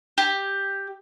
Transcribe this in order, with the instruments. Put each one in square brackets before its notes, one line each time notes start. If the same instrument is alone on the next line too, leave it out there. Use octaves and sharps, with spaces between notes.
[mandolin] G4